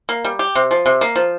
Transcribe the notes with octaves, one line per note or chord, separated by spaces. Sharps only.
A#3
G3
G4
C3
F3
C3
A#3
F3